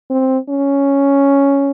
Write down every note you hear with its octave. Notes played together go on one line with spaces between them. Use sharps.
C4
C#4